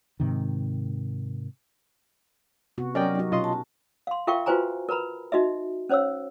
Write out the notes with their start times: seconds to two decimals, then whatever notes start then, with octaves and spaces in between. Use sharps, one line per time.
0.20 G#2 C3 D#3
2.78 C3 B3 F#4
2.95 F#3 C#4 G4 A#4 D5 D#5 G5
3.15 D#4 F#4
3.32 B2 C#4 F4 D#5 C6
3.44 A5
4.07 F5 C6
4.27 F4 A#4 E5 F5 G5 C#6
4.46 F4 F#4 B4 C5 G#5 A#5
4.89 A#4 B4 A#5 B5
5.32 D#4 F#4 D#5 E5
5.89 C#4 C5 C#5 F5 E6